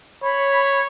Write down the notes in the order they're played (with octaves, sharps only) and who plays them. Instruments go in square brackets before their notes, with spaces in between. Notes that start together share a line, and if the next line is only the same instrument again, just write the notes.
[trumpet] C#5 [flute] B5